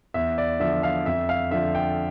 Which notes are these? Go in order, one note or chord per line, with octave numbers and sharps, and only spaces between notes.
E2 E5
D5
D3 F3 E5
F5
F2 E5
F5
D3 F3 E5
G5